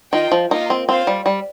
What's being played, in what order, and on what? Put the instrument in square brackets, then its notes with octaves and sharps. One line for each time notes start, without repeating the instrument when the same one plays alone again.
[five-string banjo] D#3 [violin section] F4 D#5 G5
[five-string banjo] F3
[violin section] A#3 F4 D#5 [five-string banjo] D#4
[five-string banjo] C4
[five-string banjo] C4 [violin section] F4 C5 F5
[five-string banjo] G3
G3